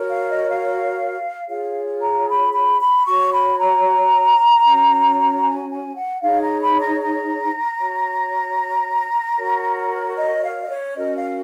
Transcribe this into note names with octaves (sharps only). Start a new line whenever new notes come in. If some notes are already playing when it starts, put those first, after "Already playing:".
Already playing: F#4 A#4 C#5
F5
D#5
F5
F4 G#4 C#5 F5
A#5
B5
B5
B5
F#4 C#5 C#6
B5
A#5
C#4 F#4 C#5
G#5
G#5
F#5
D#4 G#4 C#5 F5
A#5
B5
A#5
A#5
F#4 C#5
F#4 A#4 C#5
D#5
F5
D#5
C#5
C#4 F#4 A#4 D#5
F5